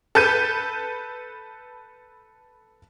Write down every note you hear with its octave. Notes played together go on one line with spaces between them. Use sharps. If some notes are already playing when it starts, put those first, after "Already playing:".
A4 B4 G6 D#7